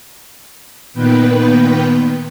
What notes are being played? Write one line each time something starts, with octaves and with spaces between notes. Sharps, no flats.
A#2 D#3 B3 B4 G5